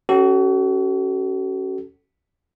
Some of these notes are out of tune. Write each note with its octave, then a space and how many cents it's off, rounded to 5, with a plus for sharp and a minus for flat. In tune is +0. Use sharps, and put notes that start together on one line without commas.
C#4 -5 F#4 +40 A4 +0